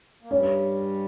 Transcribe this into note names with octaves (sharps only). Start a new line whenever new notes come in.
A#3
G2 G3 C#4